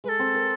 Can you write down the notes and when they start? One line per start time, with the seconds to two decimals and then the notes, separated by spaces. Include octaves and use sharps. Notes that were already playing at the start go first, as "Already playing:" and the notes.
0.04 G#3 B4
0.09 A4
0.19 C4
0.35 A#4